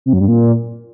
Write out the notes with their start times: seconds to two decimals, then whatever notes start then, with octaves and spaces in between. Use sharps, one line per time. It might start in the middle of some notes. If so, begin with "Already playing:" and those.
0.06 C3
0.13 F#2
0.21 G2
0.28 A#2